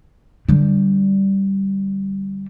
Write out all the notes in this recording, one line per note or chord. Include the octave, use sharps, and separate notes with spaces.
D3 G3